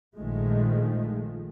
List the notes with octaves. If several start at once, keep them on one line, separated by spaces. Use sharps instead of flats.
A#1 D#3 F3 G#3 A3